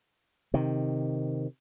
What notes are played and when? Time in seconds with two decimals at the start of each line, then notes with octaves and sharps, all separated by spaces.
0.54 C3 D#3